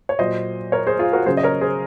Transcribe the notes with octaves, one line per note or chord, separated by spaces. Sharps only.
C#5
A#2 F#3 C5 D#5
A#4 C#5
G#4 C5
F4 G#4
F#4 A#4
C#3 F#3 G#4 C5
D#5
A#4 C#5
G#4 C5